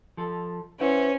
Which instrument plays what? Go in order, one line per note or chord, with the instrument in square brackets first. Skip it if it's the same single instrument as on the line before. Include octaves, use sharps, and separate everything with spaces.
[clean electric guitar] F3 A4
[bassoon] E3 [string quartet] C#4 [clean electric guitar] C5 F#5